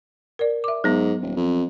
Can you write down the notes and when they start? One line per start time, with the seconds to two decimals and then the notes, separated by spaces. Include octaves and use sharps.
0.39 A#4 D5
0.64 E5 D6
0.84 G#2 F#3 B3
1.22 D#1
1.36 F2